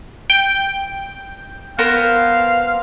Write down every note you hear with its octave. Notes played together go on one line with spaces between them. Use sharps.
G5
B3 A#4 C5 F5